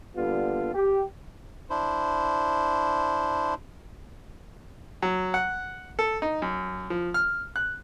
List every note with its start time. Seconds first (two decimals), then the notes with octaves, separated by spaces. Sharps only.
0.16 D3 G3 A#3 B3 F4
0.74 G4
1.70 D4 E4 C5
5.02 F#3
5.34 F#5
5.99 A4
6.22 D#4
6.42 F#2
6.90 F3
7.14 F6
7.56 F#6